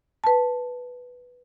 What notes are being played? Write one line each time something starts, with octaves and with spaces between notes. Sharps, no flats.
B4 A5